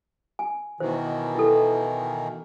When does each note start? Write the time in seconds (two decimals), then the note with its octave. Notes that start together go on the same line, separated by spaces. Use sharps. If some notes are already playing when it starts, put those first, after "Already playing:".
0.39 G#5
0.80 B2 D#3 E3 C5
1.35 E4 A4